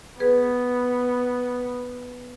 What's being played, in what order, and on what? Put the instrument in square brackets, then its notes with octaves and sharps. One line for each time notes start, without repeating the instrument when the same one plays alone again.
[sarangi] B3 [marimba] G#4 B4